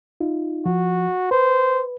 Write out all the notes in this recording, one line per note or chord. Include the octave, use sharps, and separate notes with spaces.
D#4 F4
F3 F#4
B4 C5